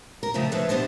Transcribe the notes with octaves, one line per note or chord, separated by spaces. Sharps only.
A#4
C#3 F3 A3 C4 D4 F4
F3 A3 D4 A4 B4 C#5
G3 B3 D4 C5 D#5